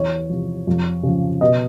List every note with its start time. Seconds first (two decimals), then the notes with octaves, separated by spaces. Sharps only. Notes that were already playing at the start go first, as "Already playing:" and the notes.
Already playing: E2 C#5
0.29 C3 F3
0.67 F2
1.03 C#3 F3
1.41 B2 D#5